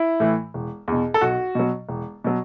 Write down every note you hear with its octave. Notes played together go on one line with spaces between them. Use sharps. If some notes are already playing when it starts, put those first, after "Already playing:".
Already playing: E4
A2 E3
E1
E2 B2
A4
B1 F#4
B2 F#3
E1
B2 F#3